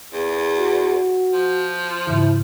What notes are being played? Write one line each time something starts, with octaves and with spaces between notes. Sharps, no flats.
E2
F#4
F3
G#2 C#3 E3 E4